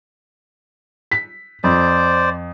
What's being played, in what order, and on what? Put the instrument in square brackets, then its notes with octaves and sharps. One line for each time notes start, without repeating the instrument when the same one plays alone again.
[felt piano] B6
[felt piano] F2 [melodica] C5 D5